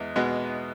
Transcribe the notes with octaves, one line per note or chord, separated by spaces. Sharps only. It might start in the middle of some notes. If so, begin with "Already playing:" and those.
Already playing: E2 G#3
B2 G#3 B3